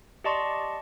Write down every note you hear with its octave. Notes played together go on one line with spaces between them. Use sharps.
G4 D5 D#5 A5 C6 C#6